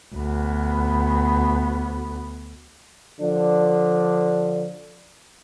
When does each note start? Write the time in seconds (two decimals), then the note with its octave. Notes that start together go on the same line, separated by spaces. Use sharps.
0.15 D2 B3
3.20 D3 F3 D4